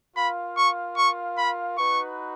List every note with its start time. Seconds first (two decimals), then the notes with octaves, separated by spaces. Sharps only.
0.16 F4 A#4 F5 B5
0.57 C#6
0.97 C#6
1.38 B5
1.78 D#4 F#4 B4 C#6